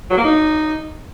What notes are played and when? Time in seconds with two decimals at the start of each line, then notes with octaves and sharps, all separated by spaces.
0.10 F#3
0.17 A#3
0.25 D#4